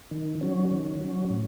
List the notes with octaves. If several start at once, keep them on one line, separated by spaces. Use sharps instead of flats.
D#3
F#3 C#4
D#3
F#3 C#4
A2